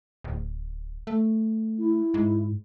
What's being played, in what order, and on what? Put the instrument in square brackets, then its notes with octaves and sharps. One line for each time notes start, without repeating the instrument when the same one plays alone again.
[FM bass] D1
A3
[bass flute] E4
[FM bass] G#2